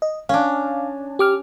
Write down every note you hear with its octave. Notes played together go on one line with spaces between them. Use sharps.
D#5
C#4 D4 F5
G4 D6 F6